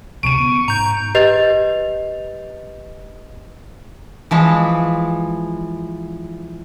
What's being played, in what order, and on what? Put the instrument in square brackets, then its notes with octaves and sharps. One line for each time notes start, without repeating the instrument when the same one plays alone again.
[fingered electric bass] D2 C3 [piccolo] C#6 [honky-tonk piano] D7 D#7
[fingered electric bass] B3
[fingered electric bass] G#2 [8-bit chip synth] A#5 G6
[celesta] G4 B4 D#5 G6 A6 F7
[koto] E3 F3 G#3